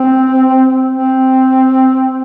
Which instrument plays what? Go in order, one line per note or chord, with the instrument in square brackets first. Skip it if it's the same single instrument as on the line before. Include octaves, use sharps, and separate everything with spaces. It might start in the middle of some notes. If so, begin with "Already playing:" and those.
Already playing: [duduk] C4
C4